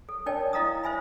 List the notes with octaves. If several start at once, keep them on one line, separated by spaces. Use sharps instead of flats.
A4
D4 A#4 C#5 D5 G5 A5
E4 D#5 F5 A#5 D#6
C5 E5 G#5 B5